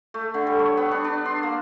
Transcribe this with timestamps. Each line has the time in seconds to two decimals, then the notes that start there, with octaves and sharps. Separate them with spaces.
0.14 A3
0.34 D3
0.47 G3
0.59 C#5
0.77 B3
0.91 D4
1.04 D4
1.25 C6
1.43 A#3